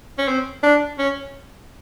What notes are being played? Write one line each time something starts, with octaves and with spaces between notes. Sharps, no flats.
C#4
C4
D4
C#4